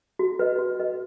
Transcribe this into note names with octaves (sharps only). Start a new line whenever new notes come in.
F#4
B4 D#5
F#4
B4 D#5